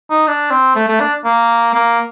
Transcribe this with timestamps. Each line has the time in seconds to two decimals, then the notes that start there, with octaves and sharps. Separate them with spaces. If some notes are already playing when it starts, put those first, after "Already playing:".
0.10 D#4
0.27 D4
0.51 C4
0.75 A3
0.88 A3
1.00 D4
1.25 A#3
1.74 A#3